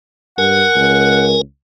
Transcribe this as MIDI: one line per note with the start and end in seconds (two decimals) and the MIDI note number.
0.38 0.63 43
0.38 1.41 70
0.38 1.24 78
0.38 1.41 80
0.76 1.38 37